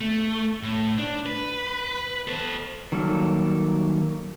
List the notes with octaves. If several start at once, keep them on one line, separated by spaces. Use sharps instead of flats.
A3
A2
D4
B4
A4 C5
D#3 F#3 G3 A#3 A4